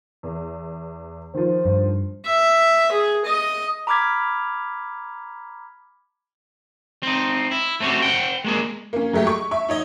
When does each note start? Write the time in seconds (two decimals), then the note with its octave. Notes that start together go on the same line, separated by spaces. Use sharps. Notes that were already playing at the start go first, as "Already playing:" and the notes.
0.23 E2
1.34 D#3 F3 C5
1.66 G2
2.26 E5
2.92 G#4
3.25 D#5
3.87 A#5 B5 D6 F6 G#6 B6
7.03 C4 D#4
7.51 E4
7.80 A3 C4 C#4 F#4 G4
8.02 C5 F#5 G5
8.44 G#3 A#3 G#4
8.93 A#3 C#4
9.13 F#3 G#3 A3 G4
9.27 C#6
9.51 E5 C#6
9.69 D#4 C#5 D#5